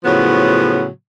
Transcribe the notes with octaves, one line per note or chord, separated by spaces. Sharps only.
A2 C#3 F3 F#3 B3